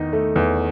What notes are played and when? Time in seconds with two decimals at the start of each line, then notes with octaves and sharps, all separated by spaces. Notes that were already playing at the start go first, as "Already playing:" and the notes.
Already playing: E2 D#3 D#4
0.13 A3
0.36 E2